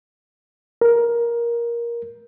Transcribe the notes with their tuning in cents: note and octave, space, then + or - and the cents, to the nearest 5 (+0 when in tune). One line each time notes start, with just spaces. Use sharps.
A#4 +15